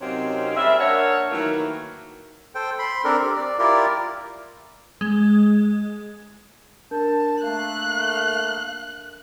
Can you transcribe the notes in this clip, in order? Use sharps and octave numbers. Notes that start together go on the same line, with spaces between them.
C3 F#3 A#3 C4 C#4 D#4
G3 G#4 A#4 E5
A#3 D4 A#4 C#5 E5 F#5
D#3 E3 F#3 A3 A#3 E4
A4 C5 G5
B5 C6
C4 D4 A4 A#4
G4
D5
E4 F4 G4 A#4 D5
G#3
D4 A#4 A5 G6
A3 A#3 F5 F#6